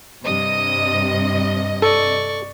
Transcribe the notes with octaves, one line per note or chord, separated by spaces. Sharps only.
G2 C3 D#5 D#6
A4 D5 C#6